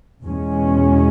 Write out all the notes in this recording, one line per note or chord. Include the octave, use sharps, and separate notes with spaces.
E2 B2 G#3 C#4